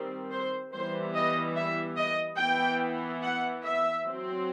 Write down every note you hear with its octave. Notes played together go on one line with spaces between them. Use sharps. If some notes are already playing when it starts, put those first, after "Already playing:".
Already playing: D#3 G3 C4
C5
E3 G3 B3 C5
D#5
E5
D#5
E3 B3 G5
F#5
E5
F#3 C4